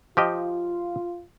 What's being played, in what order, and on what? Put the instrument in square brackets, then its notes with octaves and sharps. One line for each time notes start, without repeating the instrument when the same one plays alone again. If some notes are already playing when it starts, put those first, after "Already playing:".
[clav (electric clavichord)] F3 G4 D#5 [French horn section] F4